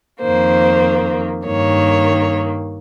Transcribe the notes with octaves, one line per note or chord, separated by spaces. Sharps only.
F2 D#3 A#3 C5
G2 D#3 A#3 C#5